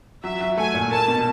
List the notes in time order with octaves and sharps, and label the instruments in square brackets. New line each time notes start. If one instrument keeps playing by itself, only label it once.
[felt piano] F#3 [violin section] E5
[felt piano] F#3
[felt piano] A3 [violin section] G#5
[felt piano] A#2
[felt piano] A#3 [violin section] A5
[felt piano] B2